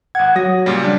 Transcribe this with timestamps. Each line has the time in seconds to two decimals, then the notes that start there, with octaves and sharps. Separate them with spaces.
0.15 G#1 F#5 G#6
0.36 F#3 D#6 A#6
0.66 A#2 C#3 G3
0.84 G3 D4